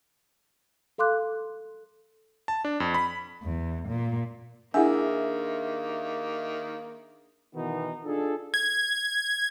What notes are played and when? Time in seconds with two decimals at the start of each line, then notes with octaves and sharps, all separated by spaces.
0.98 A4 F5 C6 D6 F#6
2.48 A5
2.65 D4
2.80 F2
2.94 B5
3.43 E2
3.88 A#2
4.74 D#3 A#3 D4 E4 G#4 E5 F#5 G#5
7.54 B2 D#3 E3 B3 D#4 F#4
8.04 D4 D#4 F4 G#4 A4
8.54 G#6